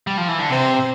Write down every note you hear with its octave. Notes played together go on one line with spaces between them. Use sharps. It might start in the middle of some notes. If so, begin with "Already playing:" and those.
G3
F3
E3
D3
C3 C5